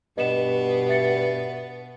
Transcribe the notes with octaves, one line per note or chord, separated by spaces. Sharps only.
G2 B2 B3 D#5 E7
E5 A6 C#7